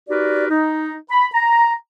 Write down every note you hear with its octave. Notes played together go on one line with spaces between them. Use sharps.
D#4 F#4 G4 A#4 B4 D5
D#4
B5
A#5